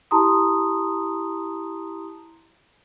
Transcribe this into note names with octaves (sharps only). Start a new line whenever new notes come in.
E4 G4 A5 A#5 C6 D#6